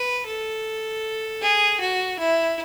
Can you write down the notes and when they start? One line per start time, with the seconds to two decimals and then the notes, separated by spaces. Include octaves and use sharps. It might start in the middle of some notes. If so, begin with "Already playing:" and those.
Already playing: B4
0.26 A4
1.42 G#4
1.80 F#4
2.19 E4